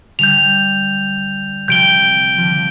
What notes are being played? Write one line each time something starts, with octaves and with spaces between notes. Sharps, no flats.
D3 G3 G6 F7
C3 F3 G6 D7 G7
F3
D3